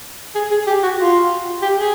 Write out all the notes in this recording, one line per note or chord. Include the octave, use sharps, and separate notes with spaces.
G#4
G#4
G4
F#4
F4
G4
G#4